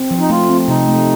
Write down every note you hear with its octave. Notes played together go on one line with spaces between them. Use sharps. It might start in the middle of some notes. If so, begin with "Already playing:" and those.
Already playing: C4
F3
D#4
A3 F4
C4
C3 D#4
A3